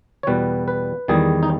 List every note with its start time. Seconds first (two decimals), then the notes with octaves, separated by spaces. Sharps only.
0.23 C#5
0.27 E2 B2 G3 B4
0.68 B4
1.08 E2 D#3 G3 G#4
1.43 D#4